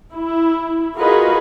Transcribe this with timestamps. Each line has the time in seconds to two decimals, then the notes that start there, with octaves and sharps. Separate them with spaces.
0.13 E4
0.96 F4 F#4 G#4 A#4 B4 D#5